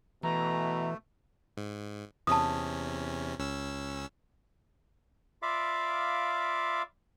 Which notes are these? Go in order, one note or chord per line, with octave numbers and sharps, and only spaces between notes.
B2 E3 A3 A#5
G#2
E2 C3 C#4 A5 D#6
C#2 C#4 E6
F4 D5 E5 F5 B5 D6